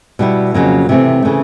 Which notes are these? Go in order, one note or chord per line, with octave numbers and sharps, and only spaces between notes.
B2 G3 B3 E4
F2 C#3 F#3 A#3
C3 E3 A3 C4
C#3 E3 A3